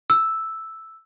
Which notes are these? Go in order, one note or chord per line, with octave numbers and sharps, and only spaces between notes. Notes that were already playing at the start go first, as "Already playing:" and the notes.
E6